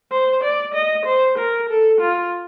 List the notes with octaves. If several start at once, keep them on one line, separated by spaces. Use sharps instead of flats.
C5
D5
D#5
C5
A#4
A4
F4